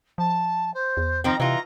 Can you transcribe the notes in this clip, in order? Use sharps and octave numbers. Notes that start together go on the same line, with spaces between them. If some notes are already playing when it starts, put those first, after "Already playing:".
F3 A5
C5
E2
D#3 F3 C4 A#5
C3 E3 F4 A#5